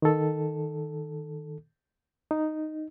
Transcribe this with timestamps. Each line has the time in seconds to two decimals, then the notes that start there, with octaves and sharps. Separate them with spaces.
0.02 D#3 A4
2.31 D#4